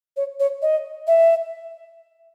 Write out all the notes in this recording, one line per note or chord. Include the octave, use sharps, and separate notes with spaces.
C#5
C#5
D#5
E5